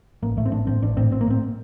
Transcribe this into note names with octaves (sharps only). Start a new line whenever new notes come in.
A1 A#3
A2 A3
C4
A1 D4
A2 C4
A1 D4
A2 C4
A1 C4
A#3
A2 C4